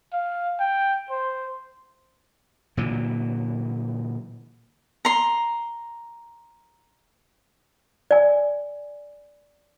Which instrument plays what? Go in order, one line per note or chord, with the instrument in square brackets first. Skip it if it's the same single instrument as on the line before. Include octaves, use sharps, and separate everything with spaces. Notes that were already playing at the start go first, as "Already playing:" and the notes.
[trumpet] F5
G5
C5
[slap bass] A#2 D3 E3 F#3
[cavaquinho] A#5 C6
[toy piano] D5 G#5